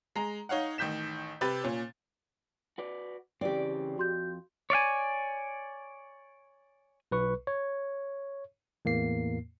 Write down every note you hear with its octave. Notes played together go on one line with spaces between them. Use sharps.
G#3 A#5
D#4 C#5 F5 F#5
A1 D#3 G6 B6 E7
C3 G4 B4 B5 A6
A#2 C#4
F#4 B4 D5
C#3 E3 C4 G4 D5
F2 F#4 C6 G6
C#5 D5 F5 G#5
B1 B4 C#6
C#5
E2 A2 A#3 C7